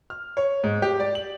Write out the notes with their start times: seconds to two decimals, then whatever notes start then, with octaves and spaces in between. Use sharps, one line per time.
0.10 F6
0.37 C#5
0.64 G#2
0.82 G4
1.00 D5
1.15 F#7